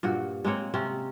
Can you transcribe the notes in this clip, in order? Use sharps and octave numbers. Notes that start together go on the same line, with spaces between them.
G2 A#2 F#4
G#3 A#3 C4 C#5
C3 C4 C#4